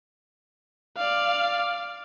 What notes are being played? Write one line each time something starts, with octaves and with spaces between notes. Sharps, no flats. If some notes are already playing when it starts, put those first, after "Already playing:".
D5 F5